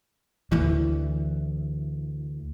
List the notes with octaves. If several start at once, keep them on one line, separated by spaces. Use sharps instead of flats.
D2 E3